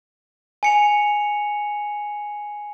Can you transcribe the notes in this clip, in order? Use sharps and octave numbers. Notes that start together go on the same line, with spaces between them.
G#5 C#7 F7